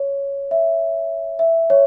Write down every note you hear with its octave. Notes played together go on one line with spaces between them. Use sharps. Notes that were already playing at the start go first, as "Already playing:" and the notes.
Already playing: C#5
E5
E5
C#5